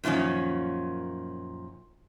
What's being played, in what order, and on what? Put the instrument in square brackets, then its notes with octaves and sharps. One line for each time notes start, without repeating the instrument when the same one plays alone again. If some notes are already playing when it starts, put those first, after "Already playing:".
[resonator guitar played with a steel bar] F#2 A#2 D#3 F3 C#4